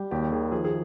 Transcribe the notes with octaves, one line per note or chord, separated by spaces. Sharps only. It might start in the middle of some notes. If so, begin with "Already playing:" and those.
Already playing: G3 G4
D#2 G4
D#3 G#4
F3 G#4
G#4